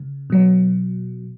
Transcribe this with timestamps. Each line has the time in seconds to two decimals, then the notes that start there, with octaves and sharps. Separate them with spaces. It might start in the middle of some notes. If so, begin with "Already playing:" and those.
Already playing: C#3
0.30 B2 F#3